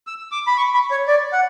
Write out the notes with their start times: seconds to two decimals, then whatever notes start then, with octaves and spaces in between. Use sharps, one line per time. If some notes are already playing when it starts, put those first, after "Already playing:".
0.07 E6
0.32 D6
0.47 B5
0.57 C#6
0.74 B5
0.91 C#5
1.08 D5
1.33 F#5